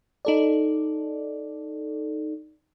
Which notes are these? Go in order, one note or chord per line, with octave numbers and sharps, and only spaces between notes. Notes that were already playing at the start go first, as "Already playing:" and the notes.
D#4 A4 D5